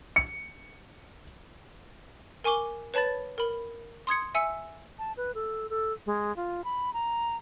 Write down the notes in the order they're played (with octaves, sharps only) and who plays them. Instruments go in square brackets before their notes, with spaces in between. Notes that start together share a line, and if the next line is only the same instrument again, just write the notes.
[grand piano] C#7
[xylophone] A#4 G#5 C#6 D6 G7
B4 C#5 A5 B5 A6
A#4 B5
C6 D#6 G#6 C#7
E5 G#5 E6 C#7
[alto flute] A5
B4
A4
A4
G#3
F4
B5
A#5